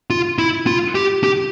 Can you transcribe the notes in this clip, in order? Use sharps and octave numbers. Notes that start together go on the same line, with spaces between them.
F4
E4
F4
G4
G4